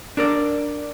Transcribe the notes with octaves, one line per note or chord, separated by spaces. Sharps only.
D4 A#4 D5